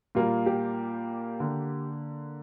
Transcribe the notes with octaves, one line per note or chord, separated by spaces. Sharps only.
A#2 G3 A#3 F4
G4
D3 A#3